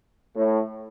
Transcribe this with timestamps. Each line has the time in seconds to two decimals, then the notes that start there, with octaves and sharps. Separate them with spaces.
0.36 A2